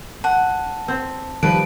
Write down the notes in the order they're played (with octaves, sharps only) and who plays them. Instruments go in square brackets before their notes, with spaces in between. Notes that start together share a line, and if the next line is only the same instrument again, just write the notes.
[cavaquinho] F#5 [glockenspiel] A5
[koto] C4
[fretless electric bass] D#3 G3 [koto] F3 [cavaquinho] B4 [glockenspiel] D7